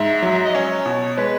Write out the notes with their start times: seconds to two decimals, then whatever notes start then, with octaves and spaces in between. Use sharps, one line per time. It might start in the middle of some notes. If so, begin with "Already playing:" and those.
Already playing: G#2 E5
0.22 F#3
0.45 D#5
0.54 C#4 C#5
0.86 B2
1.17 G#3 B4